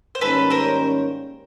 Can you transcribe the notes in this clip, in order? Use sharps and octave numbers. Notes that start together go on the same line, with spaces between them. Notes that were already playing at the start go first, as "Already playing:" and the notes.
C5
G#2 D#3 G3 A#3 C#4 A4 B4
A#4 C5